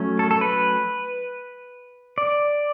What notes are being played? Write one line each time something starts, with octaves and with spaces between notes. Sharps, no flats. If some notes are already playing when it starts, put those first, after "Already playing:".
Already playing: F#3 A3 C#4
A4
A4
B4
D5